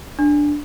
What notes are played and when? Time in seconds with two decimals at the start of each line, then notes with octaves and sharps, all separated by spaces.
0.19 D4